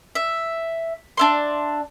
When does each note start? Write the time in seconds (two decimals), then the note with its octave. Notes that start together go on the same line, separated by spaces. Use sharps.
0.15 E5
1.17 D4 E5 C6